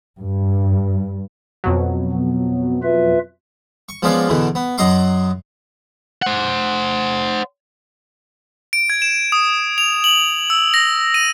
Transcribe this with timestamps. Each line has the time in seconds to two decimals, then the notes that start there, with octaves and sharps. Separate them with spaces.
0.18 G2
1.64 F2 B2 F#3
2.12 B3
2.83 F4 B4 E5
3.89 C#6
4.03 F3 G#3 B3 C#4 D5 F5
4.29 E2 B2 D3 E3
4.55 B3
4.78 F#2 F#3 D#5 A#5 C6 D6
6.22 C5 F#5
8.73 D7
8.90 G#6
9.02 E7
9.32 D#6
9.78 F7
10.04 F#7
10.50 E6
10.74 A#6
11.14 D#7